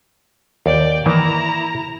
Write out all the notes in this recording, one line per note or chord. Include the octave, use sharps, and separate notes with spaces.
D#2 D5 G5
D#3 E3 A#3 E4 A#5